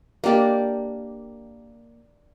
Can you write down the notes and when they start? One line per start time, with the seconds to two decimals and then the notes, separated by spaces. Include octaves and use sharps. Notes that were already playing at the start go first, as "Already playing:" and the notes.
0.24 A#3 D4 G4 D5